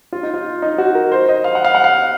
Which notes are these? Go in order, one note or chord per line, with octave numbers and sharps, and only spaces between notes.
F4
D#4
F4
D#4
F#4
A#4
C5
D#5
F5
F#5
F5
F#5
F5